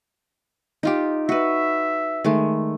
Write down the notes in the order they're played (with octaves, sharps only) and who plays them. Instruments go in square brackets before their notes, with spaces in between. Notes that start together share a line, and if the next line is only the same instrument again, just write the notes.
[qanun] D#4 F4 G4
[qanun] F#4 B4 [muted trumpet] E5
[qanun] D#3 G#3 A3